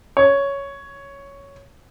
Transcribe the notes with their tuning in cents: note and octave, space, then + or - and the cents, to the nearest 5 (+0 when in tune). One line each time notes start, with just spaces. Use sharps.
C#5 +5